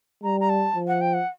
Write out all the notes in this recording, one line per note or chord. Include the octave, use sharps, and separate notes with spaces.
G3 A#5
A#5
A5
F3
F#5
G5
F#5